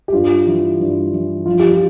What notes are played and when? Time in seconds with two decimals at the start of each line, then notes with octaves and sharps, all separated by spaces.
0.08 G4
0.12 G2 F4
0.46 E3
0.80 G2
1.12 E3
1.46 F3 F4
1.59 G4
1.74 F4